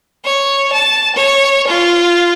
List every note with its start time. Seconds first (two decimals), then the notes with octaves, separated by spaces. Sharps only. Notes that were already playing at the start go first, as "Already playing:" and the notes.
0.25 C#5
0.72 A5
1.16 C#5
1.67 F4